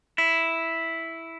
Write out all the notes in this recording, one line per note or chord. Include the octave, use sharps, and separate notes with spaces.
E4